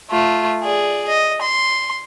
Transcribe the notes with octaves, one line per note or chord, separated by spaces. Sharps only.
A3 F4
G#4 D5
D#5
C6